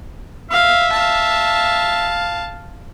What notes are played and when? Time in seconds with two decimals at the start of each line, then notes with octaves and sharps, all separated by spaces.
0.51 E5 F5
0.92 F5 A5